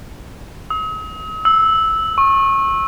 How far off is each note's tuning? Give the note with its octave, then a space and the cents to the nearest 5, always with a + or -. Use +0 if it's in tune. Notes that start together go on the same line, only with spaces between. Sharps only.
D#6 +45
E6 -10
C#6 -25